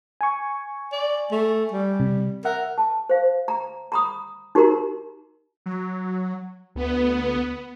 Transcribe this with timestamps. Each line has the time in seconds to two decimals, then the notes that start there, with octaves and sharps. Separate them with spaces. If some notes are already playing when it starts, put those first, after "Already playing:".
0.21 G#5 C#6
0.92 D5
1.32 A3
1.72 G3
2.00 C3
2.45 A#4 E5 F#5
2.78 A5
3.09 C5 F5
3.48 A#5
3.92 A#5 B5 D#6
4.55 D#4 F#4 G4 A#4 A#5 C6
5.66 F#3
6.75 D2 B3